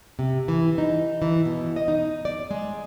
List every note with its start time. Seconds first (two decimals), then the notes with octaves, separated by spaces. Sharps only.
0.19 C3
0.48 E3
0.78 D#4
1.22 E3
1.45 B2
1.76 D#5
1.88 D#4
2.25 D5
2.51 G#3